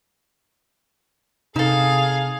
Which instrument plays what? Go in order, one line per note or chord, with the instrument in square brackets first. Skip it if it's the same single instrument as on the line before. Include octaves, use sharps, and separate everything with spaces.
[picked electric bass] C3 [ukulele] D#4 A4 [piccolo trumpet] G#4 [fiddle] F5